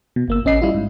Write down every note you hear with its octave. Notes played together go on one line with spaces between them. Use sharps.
B2
G1 A#3 E6
A1 C#4 D#5 C7
G3 E4 F4
G#2